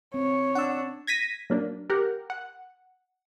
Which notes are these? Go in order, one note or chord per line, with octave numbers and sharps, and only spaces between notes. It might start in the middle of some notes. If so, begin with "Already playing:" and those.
C4 C#5
D4 F#5 E6
G#6 A#6 B6 D#7
F#3 A#3 D4
G4 A#4 F#5
F#5